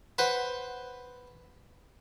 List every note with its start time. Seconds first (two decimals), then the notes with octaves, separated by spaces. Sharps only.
0.18 B4 C5 F#5